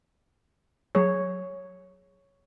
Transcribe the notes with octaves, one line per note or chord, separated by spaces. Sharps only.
F#3 G#4 C#5